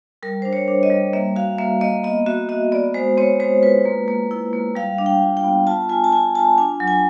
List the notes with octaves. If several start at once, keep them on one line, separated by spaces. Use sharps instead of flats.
G3 A#4
D4 C5
C#5
D4
D#5
G3
A#3 E5
F#4 F5
A#3 E5
A#3 D#5
B3 D#5
F#4 E5
F#4 D#5
B3 D5
G#3 C5
C4 C#5
G#3 C5
F4 B4
A#3
A#3
E4
A#3
G3 F5
D4
G5
F4
G5
B3
F4 A5
F4 G#5
A5
F4 G#5
F4 A5
D4 G#5
F#3
G#5